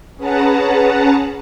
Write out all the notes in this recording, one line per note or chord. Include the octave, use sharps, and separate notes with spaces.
C#4 G#4 B4 F#5 A5 A#5